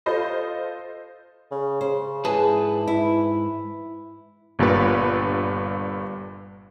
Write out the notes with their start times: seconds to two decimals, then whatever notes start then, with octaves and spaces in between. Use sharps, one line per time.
0.06 F4 A4 C5 D#5
1.51 C#3
1.81 C#3 C5
2.25 G#2 E3 G#4 B4 A5
2.88 E4
4.59 G1 G2 A#2 B4